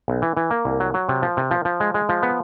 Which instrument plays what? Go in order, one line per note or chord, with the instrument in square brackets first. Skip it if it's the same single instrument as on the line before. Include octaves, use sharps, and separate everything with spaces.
[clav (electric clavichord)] B1
E3
E3
A#3
C2
F#3
F#3
C3
F3
C3
F3
F3
G#3
G#3
F3
B3